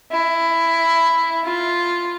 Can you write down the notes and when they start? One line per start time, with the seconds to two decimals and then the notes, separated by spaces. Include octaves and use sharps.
0.12 E4
1.44 F4